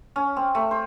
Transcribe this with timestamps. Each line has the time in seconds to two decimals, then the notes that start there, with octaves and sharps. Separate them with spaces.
0.16 C#4
0.37 C4
0.55 A3
0.71 C5